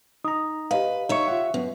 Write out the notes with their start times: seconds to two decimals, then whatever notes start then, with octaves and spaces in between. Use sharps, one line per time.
0.25 D#4 A#5 D#6
0.71 G4 B4 D#5 F5
1.09 D#4 C#5 E5 C#6
1.28 F4 F#5
1.54 F#2 B3